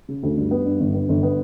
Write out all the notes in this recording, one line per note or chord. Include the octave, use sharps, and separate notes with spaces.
C#3
D2
G2
B3
G2
G1
B3
G1
B3